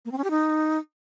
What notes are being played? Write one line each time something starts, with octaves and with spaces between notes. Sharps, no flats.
A#3
C4
C#4
G4
D#4